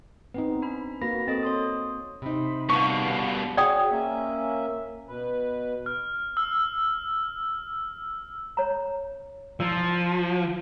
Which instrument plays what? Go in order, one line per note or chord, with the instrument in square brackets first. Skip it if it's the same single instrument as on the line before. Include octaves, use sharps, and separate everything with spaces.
[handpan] B3 C4 D#4 [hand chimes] B4
[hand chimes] D4 B5
[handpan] A#3 F#4 [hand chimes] B4 B5 A#6
[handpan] C4 [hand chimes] A4 D#5 A6
[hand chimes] C#5 C6 D#6
[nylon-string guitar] C3 D#4 [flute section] C5 B5
[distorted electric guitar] G2 B2 [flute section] F5 F#5 A5 [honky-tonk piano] C#6
[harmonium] F#4 G#4 C#5 [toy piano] D5 G5 D#6
[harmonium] A#3 C#4 E5
B2 B4
[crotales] F6
E6
[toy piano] C#5 A#5
[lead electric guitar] F3 [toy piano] E4 D5 E6